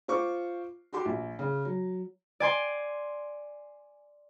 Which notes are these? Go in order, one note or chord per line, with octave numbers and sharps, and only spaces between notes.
F4 C5 C#6 D6
F#4 G4 C6 D6
A#1
C#3
F#3
D5 G#5 C6